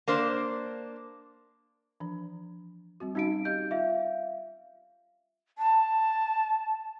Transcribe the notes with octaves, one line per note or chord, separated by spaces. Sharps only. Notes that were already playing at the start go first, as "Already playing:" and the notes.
A#3 D4 C5
E3 F3 D4
G3 C4 F#4
G3 C#4 D#4 F#4 F5 D7
G4 D#5 F5 G6
F4 E5 F5
A5